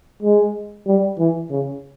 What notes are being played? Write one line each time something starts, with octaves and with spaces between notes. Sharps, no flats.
G#3
G3
E3
C#3